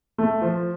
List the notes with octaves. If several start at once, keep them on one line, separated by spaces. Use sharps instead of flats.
A3
F3